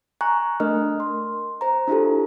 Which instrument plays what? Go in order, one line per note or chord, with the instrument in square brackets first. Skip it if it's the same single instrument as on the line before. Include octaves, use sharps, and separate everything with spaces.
[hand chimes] G#5 A#5 C#6 F#6
A3 D4 A#4 D#5 F6
C6
C5 A#5
D4 E4 F4 G4 A4